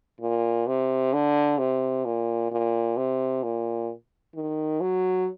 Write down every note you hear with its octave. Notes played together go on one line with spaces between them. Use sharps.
A#2
C3
D3
C3
A#2
A#2
C3
A#2
D#3
F#3